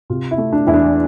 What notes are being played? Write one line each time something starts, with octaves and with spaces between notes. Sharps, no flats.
C3 F4
E4
A3
D4
E2 E4
D4